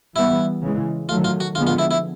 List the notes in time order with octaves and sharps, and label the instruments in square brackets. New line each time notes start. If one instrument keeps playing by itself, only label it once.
[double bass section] E3 G3 B3 [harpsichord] E4
[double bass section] C#3 E3 G#3
[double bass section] D#3 F#3 A3 [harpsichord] F4
[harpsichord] F4
F#4
[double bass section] D3 F3 G#3 B3 [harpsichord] F4
[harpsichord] F4
E4
E4